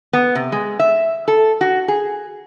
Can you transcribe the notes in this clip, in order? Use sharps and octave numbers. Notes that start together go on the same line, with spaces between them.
B3
C3
G#3
E5
A4
F#4
G#4